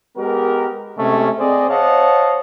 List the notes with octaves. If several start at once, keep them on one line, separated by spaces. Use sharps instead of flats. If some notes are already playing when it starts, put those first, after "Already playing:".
G#3 B3 G4 A#4
C3 G#3 A3 C#4
C4 G#4 C5 D5 D#5
C5 C#5 D#5 F5 F#5 A5